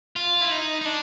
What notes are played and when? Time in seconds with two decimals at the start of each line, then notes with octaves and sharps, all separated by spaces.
0.16 F4
0.41 E4
0.51 D#4
0.81 D#4
0.85 D4